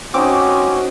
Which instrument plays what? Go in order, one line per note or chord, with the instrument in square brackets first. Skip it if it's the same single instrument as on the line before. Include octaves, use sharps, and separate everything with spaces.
[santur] C4 D#4 [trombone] C#4 [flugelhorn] F#4 [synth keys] D6